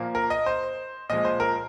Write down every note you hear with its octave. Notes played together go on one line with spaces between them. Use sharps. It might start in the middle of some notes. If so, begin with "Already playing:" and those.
Already playing: A#2 F3 A#3
A#4
D#5
C5
A#2 F3 G#3 D#5
C5
A#4